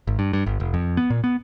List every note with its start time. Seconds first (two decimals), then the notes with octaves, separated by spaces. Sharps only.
0.07 G#1
0.19 G2
0.33 G2
0.46 G1
0.60 F1
0.74 F2
0.97 B3
1.10 A#2
1.24 B3